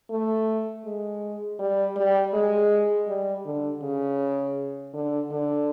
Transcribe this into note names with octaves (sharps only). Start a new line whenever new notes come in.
A3
G#3
G3
G3
G#3
G3
D3
C#3
D3
D3